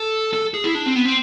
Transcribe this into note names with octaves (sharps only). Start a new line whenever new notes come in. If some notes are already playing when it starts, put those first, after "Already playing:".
Already playing: A4
A4
G#4
E4
D4
C4
B3
C4